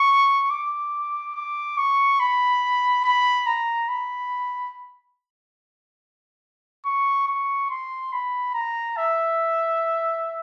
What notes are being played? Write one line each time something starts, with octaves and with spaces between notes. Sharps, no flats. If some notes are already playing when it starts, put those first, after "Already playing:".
Already playing: C#6
D6
D6
C#6
B5
B5
A#5
B5
C#6
C#6
C6
B5
A#5
E5